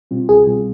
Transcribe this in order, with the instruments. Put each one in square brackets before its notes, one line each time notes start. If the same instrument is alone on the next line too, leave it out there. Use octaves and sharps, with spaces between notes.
[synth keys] B2 G3 C4 F4
[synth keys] C2 [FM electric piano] G#4
[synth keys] B2 G3 C4 F4